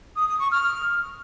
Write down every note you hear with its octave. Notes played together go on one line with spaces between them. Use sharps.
D#6
D#6
C#6
F6